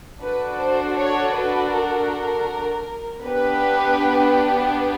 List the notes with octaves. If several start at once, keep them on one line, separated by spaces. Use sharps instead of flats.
D4 F#4 A4 B4
C5
C#5
B4
A#4
B3 D4 G4 B4